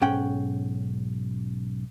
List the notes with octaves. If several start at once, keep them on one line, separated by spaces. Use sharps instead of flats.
B1 G#2 C#4 F#5 G5